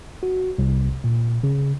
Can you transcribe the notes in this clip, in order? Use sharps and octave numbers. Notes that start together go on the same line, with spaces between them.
F#4
C2
A#2
C#3